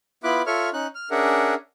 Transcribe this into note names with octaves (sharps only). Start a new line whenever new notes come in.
B3 E4 F4 B5 D6 F#6
F4 A4 C#5 E5 C#6 F6
C#4 D#4 F#6
F6
C#4 D4 G#4 A#4 E5 F#5